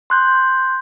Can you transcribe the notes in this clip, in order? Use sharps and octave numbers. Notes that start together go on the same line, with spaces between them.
C6 F#6 G6